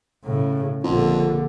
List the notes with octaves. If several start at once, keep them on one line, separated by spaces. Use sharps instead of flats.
A2 C#3
A#1 F2 D3